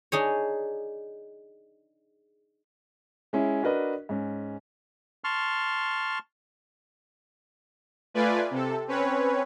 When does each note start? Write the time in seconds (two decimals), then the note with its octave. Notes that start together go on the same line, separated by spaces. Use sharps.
0.12 D4 D#4 G#4 C#5
3.33 G#3 C#4 E4
3.63 D4 F#4 A#4 B4 D#5
4.09 G#2 C#4
5.24 A5 C6 C#6 F6
8.14 A3 F4 B4 D5 G#5
8.51 C3 A4
8.87 C4 C#4 B4 C#5